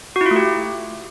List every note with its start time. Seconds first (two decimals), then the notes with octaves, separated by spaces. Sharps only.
0.16 F#4
0.21 E4
0.26 F4
0.31 A3
0.36 G4